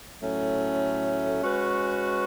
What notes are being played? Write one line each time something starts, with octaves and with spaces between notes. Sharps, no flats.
A2 F#3 A3 C#4
G#3 C#4 F#4 B4